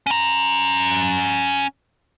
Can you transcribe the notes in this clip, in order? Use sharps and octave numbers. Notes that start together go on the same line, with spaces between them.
C#4 A#5